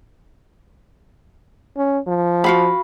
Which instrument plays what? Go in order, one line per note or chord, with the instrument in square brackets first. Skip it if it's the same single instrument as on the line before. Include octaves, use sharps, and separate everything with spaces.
[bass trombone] C#4
F3
[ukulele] F#4 F5 B5